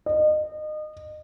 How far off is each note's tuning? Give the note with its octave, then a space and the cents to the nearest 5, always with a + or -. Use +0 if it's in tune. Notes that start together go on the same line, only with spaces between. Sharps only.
D#5 -30